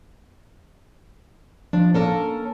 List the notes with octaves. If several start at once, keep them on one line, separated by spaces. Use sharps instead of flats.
F3 D4
A#3 C#4 A4 A#4